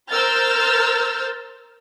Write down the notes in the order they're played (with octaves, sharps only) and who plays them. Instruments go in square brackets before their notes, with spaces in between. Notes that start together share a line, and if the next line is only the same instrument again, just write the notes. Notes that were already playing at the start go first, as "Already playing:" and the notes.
[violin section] A#4 C5 E6 F6 G6 A6